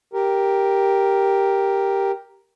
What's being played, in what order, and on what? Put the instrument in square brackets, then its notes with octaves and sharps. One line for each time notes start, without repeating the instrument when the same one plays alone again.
[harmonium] G4 A#4